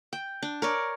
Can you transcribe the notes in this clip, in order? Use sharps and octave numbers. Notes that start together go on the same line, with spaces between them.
G5
D4
A#4 C#5 D5